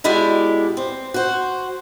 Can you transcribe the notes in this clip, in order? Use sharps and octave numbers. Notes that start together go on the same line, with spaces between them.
B2 G#3 E4 G4 D5
C4
F#4 C5